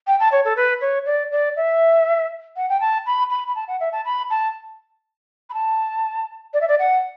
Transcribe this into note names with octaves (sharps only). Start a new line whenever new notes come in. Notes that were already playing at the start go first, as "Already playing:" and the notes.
G5
A5
C#5
A4
B4
C#5
D5
D5
E5
F#5
G5
A5
B5
B5
B5
A5
F#5
E5
A5
B5
A5
B5
A5
D5
E5
D5
F#5